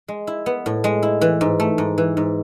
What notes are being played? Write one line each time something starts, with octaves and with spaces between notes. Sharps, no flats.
G#3
E4
B3
A2
G#3
E4
E3
G#2
A3
G#2
E3
G#2